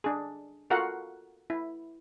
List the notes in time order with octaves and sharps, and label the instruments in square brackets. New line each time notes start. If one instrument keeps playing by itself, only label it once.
[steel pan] D4 G#4
F4 F#4 A4 A#4 F5 F#5
E4